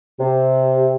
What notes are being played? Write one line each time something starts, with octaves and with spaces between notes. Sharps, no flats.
C3